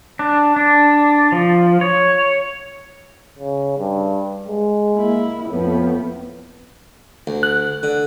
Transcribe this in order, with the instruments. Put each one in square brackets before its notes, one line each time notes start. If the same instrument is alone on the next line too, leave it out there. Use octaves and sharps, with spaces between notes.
[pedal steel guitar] D4
D4
F3
C#5
[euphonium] C#3
G2
G#3
[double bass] A#3 E4
[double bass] F2 B3 [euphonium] A2
[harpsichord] D2
[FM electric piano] F#6
[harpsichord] D3